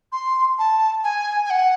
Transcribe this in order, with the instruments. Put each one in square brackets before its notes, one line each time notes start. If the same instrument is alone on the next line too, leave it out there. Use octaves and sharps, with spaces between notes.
[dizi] C6
A5
G#5
G#5
F#5